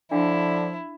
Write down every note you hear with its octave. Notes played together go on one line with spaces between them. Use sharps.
D3 F3 D4 E4 F5